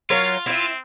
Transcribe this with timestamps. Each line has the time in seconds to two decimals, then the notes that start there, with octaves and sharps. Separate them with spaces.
0.10 F#3 F4 A#4 C#5 F5
0.46 C4 E4 E5